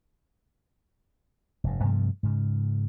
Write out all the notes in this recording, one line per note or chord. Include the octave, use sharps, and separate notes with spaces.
F1 G2
G2 C3 F3 A3
G#2 C#3